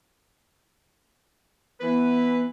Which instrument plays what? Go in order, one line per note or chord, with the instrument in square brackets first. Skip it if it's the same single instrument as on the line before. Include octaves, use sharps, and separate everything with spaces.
[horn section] E3 B4 [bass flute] B3